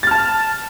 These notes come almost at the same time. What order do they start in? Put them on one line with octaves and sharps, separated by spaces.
A6 F6 A5